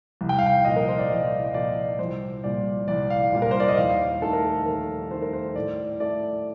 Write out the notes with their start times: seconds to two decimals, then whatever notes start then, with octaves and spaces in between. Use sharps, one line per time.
0.21 C2
0.29 G5
0.39 F5
0.46 G5
0.65 A#2 F3 D#5
0.76 A#4
0.88 C5
0.98 D5
1.09 C2 D#5
1.47 D#5
1.54 A#2 F3 D5
1.99 C2 C5
2.44 A#2 G3 D5
2.88 C2 D5
3.10 F5
3.33 A#2 G3
3.42 A#4
3.51 C5
3.60 D5
3.68 D#5
3.77 D#2 F5
4.21 D#3 A3 A4
4.33 A#4
4.45 A4
4.66 D#2 A#4
5.11 D#3 A3 C5
5.22 A#4
5.33 C5
5.56 A2 D5
6.00 A3 D5